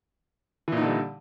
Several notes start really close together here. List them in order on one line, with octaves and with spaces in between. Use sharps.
E3 A#2 D#4 D3 G3